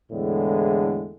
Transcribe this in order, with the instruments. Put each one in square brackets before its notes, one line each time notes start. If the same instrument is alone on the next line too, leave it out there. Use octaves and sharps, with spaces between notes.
[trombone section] E2 A2 D3 G#3